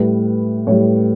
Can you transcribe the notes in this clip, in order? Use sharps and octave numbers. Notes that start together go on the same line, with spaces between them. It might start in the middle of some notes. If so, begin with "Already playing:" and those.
Already playing: A2 G3 B4
A2 G3 C#5